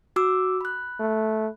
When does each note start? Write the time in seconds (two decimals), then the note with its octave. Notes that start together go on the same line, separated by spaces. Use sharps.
0.16 F#4 D6 E6
0.61 B5 F#6
0.99 A3